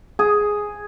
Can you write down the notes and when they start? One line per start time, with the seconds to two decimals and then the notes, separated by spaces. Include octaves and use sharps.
0.19 G#4